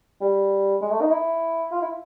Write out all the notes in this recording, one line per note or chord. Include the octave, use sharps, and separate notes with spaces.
G3
G#3
A3
D#4
E4
F4
E4